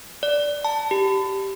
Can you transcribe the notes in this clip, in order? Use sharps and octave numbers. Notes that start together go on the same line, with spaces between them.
D5
A5
G4